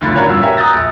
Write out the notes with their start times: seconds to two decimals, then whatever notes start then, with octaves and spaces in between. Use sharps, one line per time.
0.01 B1 A2 D3 F4 B5 A6
0.15 C#4 F#4 A#4 C#5 D5
0.28 G2 A#2 F5 E6
0.42 F#4 G4 A#4 C#5 E5 G#5
0.57 A#5 D#6 F#6 G6 A6 A#6
0.73 A#1